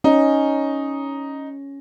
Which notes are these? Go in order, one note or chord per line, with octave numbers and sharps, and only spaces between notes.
C#4 D#4